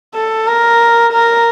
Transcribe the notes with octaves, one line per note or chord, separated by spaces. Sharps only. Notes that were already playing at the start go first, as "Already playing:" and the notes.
A4
A#4
A#4